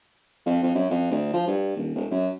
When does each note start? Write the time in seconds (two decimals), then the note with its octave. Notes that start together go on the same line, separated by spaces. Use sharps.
0.46 F2
0.63 F2
0.75 F#2
0.90 F2
1.11 D2
1.33 F3
1.48 G2
1.77 D#1
1.95 E1
2.11 F#2